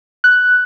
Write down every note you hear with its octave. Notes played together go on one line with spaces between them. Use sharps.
F#6